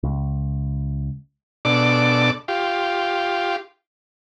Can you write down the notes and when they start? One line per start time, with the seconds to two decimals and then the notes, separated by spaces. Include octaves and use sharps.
0.03 C#2
1.65 B2 D4 A4 D5 D6
2.48 F4 G4